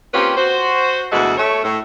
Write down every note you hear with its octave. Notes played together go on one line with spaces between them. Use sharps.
A#3 C4 C#4 F4 G4 B4
F#4 C5
D2 B2 E3 G#3 F#4 A4
A3 C#5
A2